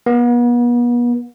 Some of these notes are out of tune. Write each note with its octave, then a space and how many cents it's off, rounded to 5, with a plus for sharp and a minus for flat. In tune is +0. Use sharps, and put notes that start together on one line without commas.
B3 -40